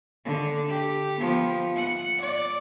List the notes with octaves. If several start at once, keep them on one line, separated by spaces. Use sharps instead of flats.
D3
G4
F3 B3
F#5
D5